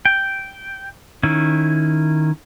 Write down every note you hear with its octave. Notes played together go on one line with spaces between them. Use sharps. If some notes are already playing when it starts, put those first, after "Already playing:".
G5
D#3 C#4 E4